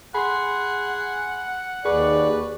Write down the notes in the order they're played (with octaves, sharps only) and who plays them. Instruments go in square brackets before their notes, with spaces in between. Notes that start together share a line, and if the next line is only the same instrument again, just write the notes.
[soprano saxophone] G#4 [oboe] F#5 [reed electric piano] B5 C6
[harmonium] D#2 D5 [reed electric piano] G#4 C#6 [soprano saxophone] B4